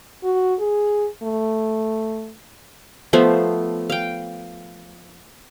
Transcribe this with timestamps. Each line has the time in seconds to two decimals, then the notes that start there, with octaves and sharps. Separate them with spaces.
0.23 F#4
0.60 G#4
1.23 A3
3.13 F3 A3 B3 C5
3.90 F5 G5